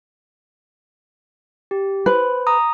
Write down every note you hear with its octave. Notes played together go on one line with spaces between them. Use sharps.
G4
B4 C5
A#5 D#6